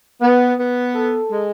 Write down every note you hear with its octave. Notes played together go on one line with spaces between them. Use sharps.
B3
B3
A4
G#3